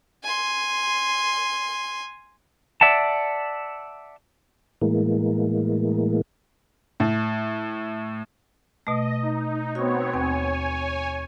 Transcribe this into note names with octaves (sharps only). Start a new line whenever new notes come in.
G#5 C6
D5 E5 F#5 A5
A2 E3 G#3 A#3
A2
B2 A3 D#5
D#4
B3 C4 F#4 C#5
D#2 C4 C#5 G#5